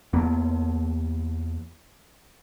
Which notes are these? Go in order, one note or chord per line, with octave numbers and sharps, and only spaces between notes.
E2 A#3 B3